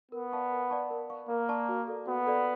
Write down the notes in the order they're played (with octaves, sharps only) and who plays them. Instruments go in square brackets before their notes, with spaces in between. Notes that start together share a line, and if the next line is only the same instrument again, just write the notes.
[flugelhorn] B3 [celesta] A#4
[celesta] D5 F5 A5 C#6
A#4
D5 F5 A5 C#6
A#4
D5 F5 A5 C#6
[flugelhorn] A#3 [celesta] A#4
[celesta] D5 F5 A5 C#6
F#4
A4 D5
[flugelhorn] B3 [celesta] F#4
[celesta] A4 D5